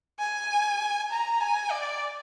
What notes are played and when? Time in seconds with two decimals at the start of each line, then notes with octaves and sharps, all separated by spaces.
0.19 G#5
1.10 A#5
1.41 G#5
1.71 D5